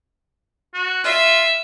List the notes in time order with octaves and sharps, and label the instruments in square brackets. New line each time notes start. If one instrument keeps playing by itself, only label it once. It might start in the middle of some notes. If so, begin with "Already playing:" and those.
[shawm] F#4
[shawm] F4 [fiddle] E5